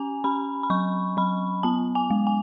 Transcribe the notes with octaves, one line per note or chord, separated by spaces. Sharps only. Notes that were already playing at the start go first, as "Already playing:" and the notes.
Already playing: C#4 G#5
C#4 B5
B5
F#3 C#6
F#3 B5
B3 A5
G#5
G#3
G#5